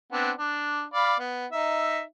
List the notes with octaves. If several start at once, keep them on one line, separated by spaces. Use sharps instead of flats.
B3 C4 D4
D4
D5 F5 B5
B3
D#4 E5